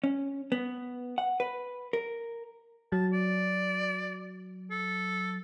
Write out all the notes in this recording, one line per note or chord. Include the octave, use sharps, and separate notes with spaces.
C#4
B3
F#5
B4
A#4
F#3 A5
D5
A4